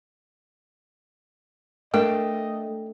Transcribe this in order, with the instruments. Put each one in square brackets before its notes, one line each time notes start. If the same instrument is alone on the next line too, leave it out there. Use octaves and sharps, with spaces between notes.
[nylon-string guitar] A3 [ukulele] D4 G5 [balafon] A#4 [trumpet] D#5